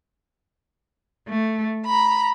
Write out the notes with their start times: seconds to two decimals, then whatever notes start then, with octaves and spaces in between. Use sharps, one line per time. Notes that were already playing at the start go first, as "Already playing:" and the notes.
1.28 A3
1.85 A#5 B5